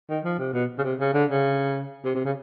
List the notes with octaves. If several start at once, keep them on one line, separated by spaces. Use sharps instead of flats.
D#3
F3
C3
B2
C#3
C3
C#3
D3
C#3
C3
C3
C#3